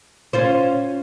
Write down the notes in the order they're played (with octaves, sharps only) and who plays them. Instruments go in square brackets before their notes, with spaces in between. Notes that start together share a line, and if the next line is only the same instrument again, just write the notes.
[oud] C#4 F4 C5